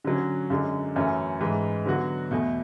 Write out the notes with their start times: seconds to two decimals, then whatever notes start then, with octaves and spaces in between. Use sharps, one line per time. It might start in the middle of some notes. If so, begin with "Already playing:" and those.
0.04 D3 F#3 C#4
0.50 F#2 D3 G#3
0.96 F#2 E3 A3 C#4
1.41 G#2 E3 G#3
1.86 D3 F#3 B3 F#4
2.31 E2 B2 A3